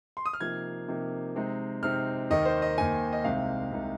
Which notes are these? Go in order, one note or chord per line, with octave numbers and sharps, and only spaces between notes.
C6
D#6
F6
C3 F3 A#3 D#4 G#6
C3 F3 A#3 D#4
C3 G#3 C4 D#4
C3 G#3 C4 D#4 F6
D#2 D#3 A#3 D#4 D#5
C5
D#5
D#2 D#3 A#3 D#4 G#5
D#5
C2 C3 G#3 C4 D#4 F5
C2 C3 G#3 C4 D#4